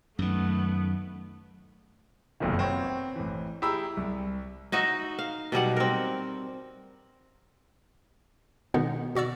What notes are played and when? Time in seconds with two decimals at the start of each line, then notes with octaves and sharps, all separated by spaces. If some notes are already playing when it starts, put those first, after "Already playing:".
0.19 F#2 D#3 A3 B3
2.40 F#1 B1 F2 C3 D#3
2.58 B3 C4 C#5
3.16 A1 E3
3.62 E4 G4 G#4 A#5 B5 E6
3.97 C2
4.72 D#4 F#4 D#5 E5
5.19 F5
5.52 B2 F#3 G3 F#5
5.77 C4 A#4
8.74 B2 D3 D#3 G#3 B3 D#4
9.15 B2 F#4 D5 E6